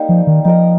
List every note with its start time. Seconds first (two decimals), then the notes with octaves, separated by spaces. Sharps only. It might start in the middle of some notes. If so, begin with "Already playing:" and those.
Already playing: G3 A#3 D#4 G4
0.09 F3
0.27 D#3
0.45 F3 D#4 A#4 D#5